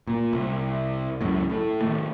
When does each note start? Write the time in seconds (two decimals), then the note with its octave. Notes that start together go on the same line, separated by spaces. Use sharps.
0.07 A#2
0.33 C2
1.21 C#2 F#2 A2
1.50 A2
1.82 D#3 A3